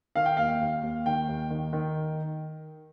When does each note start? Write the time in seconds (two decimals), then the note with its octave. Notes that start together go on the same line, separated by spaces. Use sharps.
0.15 D#3 F5
0.26 G5
0.37 D#2 F5
0.61 D#2
0.83 D#2
1.06 D#3 G5
1.28 D#2
1.50 D#3
1.73 D#3